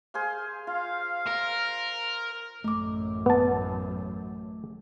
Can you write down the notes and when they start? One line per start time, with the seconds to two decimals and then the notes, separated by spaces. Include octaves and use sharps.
0.14 G#4 C5 F5
0.67 F4 F5
1.27 A#4
2.64 A1 F#2 A3 D6
3.26 B3 A5